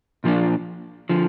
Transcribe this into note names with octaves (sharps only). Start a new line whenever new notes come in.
A#2 F3 A#3 D4
D3 F3